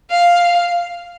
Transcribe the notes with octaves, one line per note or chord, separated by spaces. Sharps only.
F5